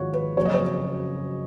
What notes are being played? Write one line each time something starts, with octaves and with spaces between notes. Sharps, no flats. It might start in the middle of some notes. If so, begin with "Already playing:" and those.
Already playing: G#1 G#2 F3 F#4 C#5
B4
F#1 F2 C#3 F#3 C#5
D#5
C#5